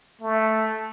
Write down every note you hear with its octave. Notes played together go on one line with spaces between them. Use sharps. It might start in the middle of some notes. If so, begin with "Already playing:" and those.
A3